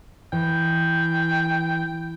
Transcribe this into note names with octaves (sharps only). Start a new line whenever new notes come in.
E3 G5